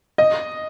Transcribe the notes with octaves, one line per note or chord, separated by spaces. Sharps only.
D#5